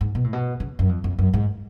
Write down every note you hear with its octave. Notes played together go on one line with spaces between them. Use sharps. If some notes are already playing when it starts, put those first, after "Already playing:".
G#2
B2
A2
B2
C#3
F#2
F2
F2
F#2
G#2